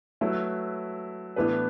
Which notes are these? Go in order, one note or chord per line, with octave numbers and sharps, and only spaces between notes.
F#3 A3 E4 B4
A2 E3 B3 D4 B4